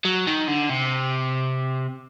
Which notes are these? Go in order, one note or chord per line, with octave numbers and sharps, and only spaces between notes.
F#3
D#3
D3
C3